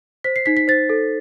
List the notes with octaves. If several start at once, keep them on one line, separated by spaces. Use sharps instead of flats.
C5 B6
C7
D#4 B6
B6
C5 A6
A4